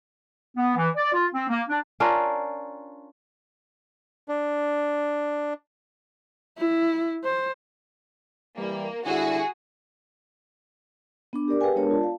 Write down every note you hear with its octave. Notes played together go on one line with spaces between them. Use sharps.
B3
E3
D5
F4
C4
A#3
D4
C#4 D4 F4 A#4
D4
E4
C5
E3 G3 A#3
D3 G3 E4 F#4 G#4
B3 D4 D6
G4 A#4 D5 D6
G4 G#4 B4 F5 G5 G#5
G#3 B3 D4 A#4 C#5 A5
F4 D5 A5
F5